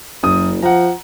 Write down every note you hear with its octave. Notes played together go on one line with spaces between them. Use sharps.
F#1 F#2 D#6
F3 F#5 A#5